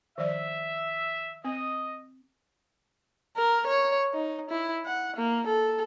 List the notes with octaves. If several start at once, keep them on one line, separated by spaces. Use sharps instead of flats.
D#3 F3 D5 E5
C4 D#5
A#4
C#5
D#4
E4
F#5
A#3
A4